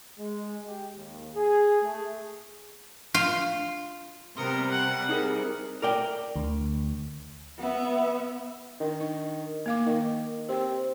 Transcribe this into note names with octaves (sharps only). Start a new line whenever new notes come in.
G#3
G4
D#2
G#4
A3
F4
C3 G3 B3 A#4 C6 D#6 C#7
F#5
D#4 G#4 A#4
A#4 D5 G5
D2
B3 E5
D#3 D4
D#4
A#3 F5 D6
D#3 D#4
C4 G4 C5